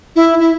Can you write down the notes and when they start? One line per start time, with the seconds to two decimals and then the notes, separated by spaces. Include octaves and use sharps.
0.16 E4
0.39 E4